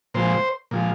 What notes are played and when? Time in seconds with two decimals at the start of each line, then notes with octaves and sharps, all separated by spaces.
0.14 A#2 F3 G#3 C5
0.71 A#2 F3 G#3